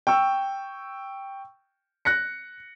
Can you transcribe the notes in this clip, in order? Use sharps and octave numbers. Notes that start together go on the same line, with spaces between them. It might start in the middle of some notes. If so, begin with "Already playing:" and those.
G5 C#6 E6
F#6 A#6 C#7